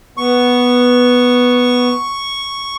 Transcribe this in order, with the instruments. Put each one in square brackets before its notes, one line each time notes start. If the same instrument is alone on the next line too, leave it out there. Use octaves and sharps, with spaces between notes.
[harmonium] B3 [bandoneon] C#6